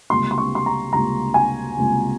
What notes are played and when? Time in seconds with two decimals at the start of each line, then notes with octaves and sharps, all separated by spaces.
0.10 C#2 C3 G3 A#3 C6
0.31 C6
0.38 C#6
0.55 C6
0.66 A#5
0.93 C#2 C3 G3 A#3 A#5
1.34 G#5
1.76 C#2 C3 G3 A#3